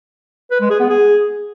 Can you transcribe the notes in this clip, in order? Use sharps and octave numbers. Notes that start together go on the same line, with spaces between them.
B4
G#3
G#4
B3
G#4